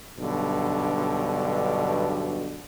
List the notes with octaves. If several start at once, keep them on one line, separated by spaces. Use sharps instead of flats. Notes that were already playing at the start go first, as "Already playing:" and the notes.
B1 G2 B2 D3